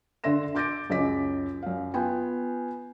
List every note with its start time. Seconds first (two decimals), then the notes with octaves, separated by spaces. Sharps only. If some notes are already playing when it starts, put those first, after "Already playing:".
0.24 D3 E5 C6 A#6 E7
0.55 C6 D6 G6 A6 A#6 D7
0.90 C#2 F#2 C#3 D#5 D6 B6
1.63 F#2 F5
1.94 B3 F4 G5 G#5